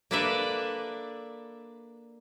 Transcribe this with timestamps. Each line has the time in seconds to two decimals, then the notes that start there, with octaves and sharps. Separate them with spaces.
0.11 A#3 D4 A4 B4 D5 E5